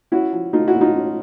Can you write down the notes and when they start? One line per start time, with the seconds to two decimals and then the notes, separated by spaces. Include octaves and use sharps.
0.12 C#4 E4 F#4
0.33 F3
0.53 A3 D#4 F4
0.68 E4 F#4
0.75 A2
0.81 D#4 F4
0.95 C#4